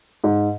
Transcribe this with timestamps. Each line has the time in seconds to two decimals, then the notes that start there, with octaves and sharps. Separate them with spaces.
0.24 G#2